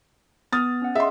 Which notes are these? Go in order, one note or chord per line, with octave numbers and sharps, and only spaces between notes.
B3 D#6 F6 A6
C#4 F#5
G#4 D#5 E5 C6